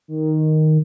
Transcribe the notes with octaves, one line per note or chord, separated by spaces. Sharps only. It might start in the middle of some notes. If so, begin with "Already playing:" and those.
D#3